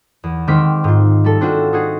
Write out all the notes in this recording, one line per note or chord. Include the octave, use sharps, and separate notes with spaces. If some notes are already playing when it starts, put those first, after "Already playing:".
E2
D#3 G#3 C4 D6 F6 B6
G#2 F4
G3 A4
C4 D4 F4 F#4
D#4 F#4 G#4